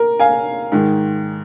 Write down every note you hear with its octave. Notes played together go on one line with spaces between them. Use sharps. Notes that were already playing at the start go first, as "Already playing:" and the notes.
Already playing: A#4
F5 G#5
G#2 D#3